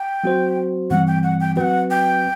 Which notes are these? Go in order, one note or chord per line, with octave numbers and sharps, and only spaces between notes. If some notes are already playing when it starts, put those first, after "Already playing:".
Already playing: G5
F#3 C4 F#4 C5
G2 E3 G3 C4 F#5
G5
F#5
G5
F#3 C4 F#4 B4 F#5 G5
G5